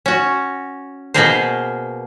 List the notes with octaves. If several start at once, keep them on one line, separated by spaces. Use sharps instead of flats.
C#4 F#4
B2 A#3 B3 G#4 A#4 C5